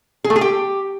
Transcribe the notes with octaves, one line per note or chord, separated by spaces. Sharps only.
G#4
A3
G#4
G4